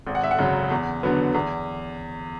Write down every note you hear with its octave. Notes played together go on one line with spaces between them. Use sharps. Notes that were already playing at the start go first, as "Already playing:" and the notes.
G#1
F#5
E5
F#5
F#2 C#3 F#3
E2
D3 F#3 B3
E2